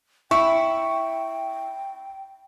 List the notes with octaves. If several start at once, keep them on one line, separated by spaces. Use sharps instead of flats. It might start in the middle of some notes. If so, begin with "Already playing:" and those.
E4 G5 C#6